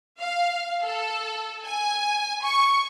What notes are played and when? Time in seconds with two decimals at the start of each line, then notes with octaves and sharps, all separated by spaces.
0.20 F5
0.84 A4
1.65 G#5
2.43 C#6